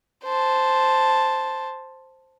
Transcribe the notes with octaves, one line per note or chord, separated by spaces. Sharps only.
C5 A5